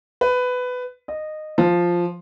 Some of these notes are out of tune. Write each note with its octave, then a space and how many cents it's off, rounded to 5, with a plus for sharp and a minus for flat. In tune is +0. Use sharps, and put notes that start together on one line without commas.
B4 +15
D#5 -15
F3 +0